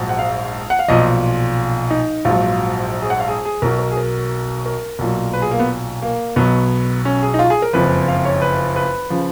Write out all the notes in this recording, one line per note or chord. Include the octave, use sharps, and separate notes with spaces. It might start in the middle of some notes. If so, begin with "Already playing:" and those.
Already playing: A#1 G#2 F#3
F#5
F5
F#5
F5
B1 A#2 F3 D#5
D#4
A#1 G#2 F#3 F4
G#4
F#5
F5
G#4
G#4
B1 B2 F#3 A#4
A#4
G#4
A#4
A#4
B1 A#2 F#3
B4
G#4
A#3
B3
A#3
B1 B2 F#3 B3
C#4
G#4
D#4
F4
G#4
A#4
F#1 F2 F3 B4
F5
C#5
B4
B4
C#3 F3